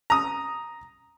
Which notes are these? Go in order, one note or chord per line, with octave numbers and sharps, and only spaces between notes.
A#5 D#6